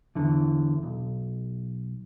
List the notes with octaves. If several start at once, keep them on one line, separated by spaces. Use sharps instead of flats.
E2 D3 E3
B1